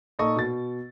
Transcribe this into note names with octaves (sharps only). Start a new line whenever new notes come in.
A#2 D#4 A4 D#5 C#6
B2 A6